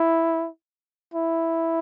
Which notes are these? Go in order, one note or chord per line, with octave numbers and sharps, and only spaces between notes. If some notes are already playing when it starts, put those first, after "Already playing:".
Already playing: E4
E4